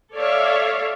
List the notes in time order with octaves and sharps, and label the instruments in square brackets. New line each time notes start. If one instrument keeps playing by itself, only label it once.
[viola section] A4 C#5 D5 E5 F5